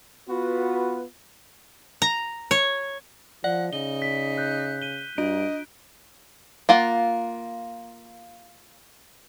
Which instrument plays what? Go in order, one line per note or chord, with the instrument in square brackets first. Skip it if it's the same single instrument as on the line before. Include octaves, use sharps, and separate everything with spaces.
[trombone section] B3 F4 B4 [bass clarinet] F#4
[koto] A#5
C#5
[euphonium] F3 [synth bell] D5 [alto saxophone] F#5
[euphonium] C#3 [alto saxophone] D#4 [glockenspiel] G7
[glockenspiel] B6
F#6 G6
D#7 G7
[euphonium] G2 [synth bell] D4 D7 [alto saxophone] D#5
[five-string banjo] A#3 F4 F#5